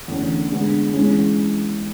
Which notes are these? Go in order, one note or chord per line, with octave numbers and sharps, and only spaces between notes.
E2 D3 A3 C#4
D3 G#3 B3
E3 G#3 C#4